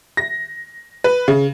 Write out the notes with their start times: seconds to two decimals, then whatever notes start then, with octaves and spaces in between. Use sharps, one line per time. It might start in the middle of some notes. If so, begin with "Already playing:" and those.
0.17 A#6
1.04 B4
1.28 C#3